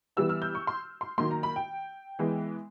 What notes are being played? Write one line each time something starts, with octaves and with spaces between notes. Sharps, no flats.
E3 G3 B3 E6
F6
G6
C#6
C6
C6
D#3 F#3 A#3 C6
A#5
B5
G5
E3 G#3 B3